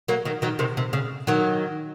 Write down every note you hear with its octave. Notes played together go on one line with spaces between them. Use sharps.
F#3 A#3
D#3 F#3
D#3 F#3
C3 D#3
C3
C#3
D#3 F#3